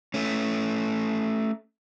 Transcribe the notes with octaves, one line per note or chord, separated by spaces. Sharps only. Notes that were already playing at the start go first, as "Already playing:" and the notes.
A3 C#4